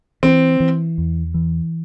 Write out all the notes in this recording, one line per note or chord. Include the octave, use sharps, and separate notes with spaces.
E3 C4
E3
E2
E3